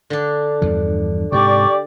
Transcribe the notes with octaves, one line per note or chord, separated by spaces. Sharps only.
D3 D4
E2 G2 F3
G#2 C3 G4 D5 C#6